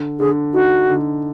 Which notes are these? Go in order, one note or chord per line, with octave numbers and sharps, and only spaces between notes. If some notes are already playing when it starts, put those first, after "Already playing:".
Already playing: D3
D3 G#4
D#4 F#4
D3